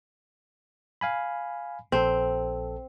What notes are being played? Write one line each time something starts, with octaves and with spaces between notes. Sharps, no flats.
F5 G#5 B5
A#1 C4 A4